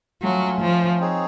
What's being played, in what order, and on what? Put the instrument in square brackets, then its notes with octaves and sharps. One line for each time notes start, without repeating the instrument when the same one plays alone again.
[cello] F#3 [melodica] A3 C#4 F4
[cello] F3
[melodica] C4 D#4 G#4 C#5